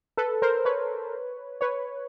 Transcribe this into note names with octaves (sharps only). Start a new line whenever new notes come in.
A4 B4
A#4 C5
B4 C#5
B4 C#5